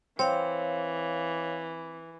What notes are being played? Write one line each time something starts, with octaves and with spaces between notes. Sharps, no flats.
E3 C4 C#5 F5